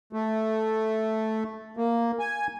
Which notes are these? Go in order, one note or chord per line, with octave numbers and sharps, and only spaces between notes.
A3
A#3
G#5